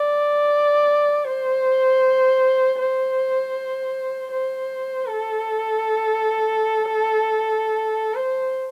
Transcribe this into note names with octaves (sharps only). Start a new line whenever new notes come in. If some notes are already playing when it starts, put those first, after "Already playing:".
Already playing: D5
C5
C5
C5
A4
C5